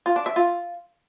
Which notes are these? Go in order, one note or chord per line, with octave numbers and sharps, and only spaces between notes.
F4
D4
E5
F4